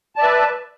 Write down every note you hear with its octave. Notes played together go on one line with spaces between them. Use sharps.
B4 D5 E5 A5